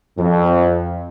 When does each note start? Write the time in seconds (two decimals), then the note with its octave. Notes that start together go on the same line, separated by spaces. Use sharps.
0.17 F2